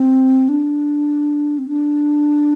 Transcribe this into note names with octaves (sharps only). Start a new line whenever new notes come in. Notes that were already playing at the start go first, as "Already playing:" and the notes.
Already playing: C4
D4
C4
D4